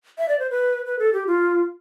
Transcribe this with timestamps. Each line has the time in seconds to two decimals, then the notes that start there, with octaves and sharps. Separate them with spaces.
0.18 E5
0.29 D5
0.39 C5
0.50 B4
0.86 B4
0.99 A4
1.13 G4
1.27 F4